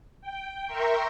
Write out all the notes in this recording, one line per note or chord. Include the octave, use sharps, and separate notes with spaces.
G5
A#4 E5 G5 A#5 C6 C#6